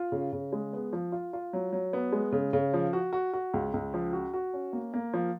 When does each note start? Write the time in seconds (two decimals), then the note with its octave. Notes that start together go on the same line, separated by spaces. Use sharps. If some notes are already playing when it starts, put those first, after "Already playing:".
Already playing: F4
0.12 C#3
0.33 C#3
0.53 G#3
0.73 B3
0.93 F3
1.12 F4
1.33 F4
1.53 F#3
1.73 F#3
1.93 B3
2.12 G#3
2.32 C#3
2.53 C#3
2.74 F3
2.93 F#4
3.13 F#4
3.33 F#4
3.54 C#2
3.74 C#2
3.94 F3
4.13 F#4
4.34 F#4
4.54 C#4
4.73 A#3
4.94 A#3
5.13 F3